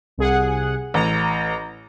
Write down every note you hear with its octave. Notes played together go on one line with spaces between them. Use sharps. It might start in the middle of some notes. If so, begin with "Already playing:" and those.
C2 G#4 F#5
A1 A#5